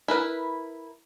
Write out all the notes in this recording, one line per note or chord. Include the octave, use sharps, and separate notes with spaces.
E4 A#4 B4